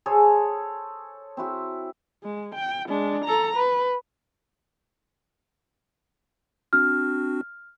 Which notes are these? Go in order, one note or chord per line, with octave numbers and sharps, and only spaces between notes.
G#4 A4 C5 C#5
C4 E4 F#4
G#3
G5
G#3 D4
A4 A#5
B4
C4 D4 F#4 F6